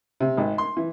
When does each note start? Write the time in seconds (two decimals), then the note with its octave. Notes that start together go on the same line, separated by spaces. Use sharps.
0.20 C3
0.37 G#1
0.58 C6
0.77 E3